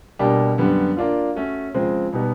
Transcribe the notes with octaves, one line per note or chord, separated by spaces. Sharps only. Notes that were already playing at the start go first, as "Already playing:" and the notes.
B2 G3 A#3 D4 G4
F#2 D3 G3 B3
A#3 D4 F4
A3 C#4 F#4
C#3 F3 G#3 C4
B2 G3 B3 D#4